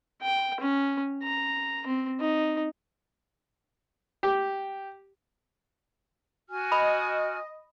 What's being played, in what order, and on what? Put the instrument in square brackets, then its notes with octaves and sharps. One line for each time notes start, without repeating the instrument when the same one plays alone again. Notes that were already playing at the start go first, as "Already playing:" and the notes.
[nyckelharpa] G5
C#4
A#5
C4
D#4
[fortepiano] G4
[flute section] F#4 G#5 F6
[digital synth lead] D#5 [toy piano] B5